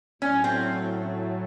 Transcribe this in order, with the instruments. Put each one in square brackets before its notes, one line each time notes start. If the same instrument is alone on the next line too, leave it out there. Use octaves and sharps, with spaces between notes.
[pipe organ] A2 F#3 A3 [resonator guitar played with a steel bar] C#4
[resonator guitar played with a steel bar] C4